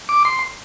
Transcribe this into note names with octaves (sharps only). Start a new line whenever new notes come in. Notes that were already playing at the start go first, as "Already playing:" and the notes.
D6
C6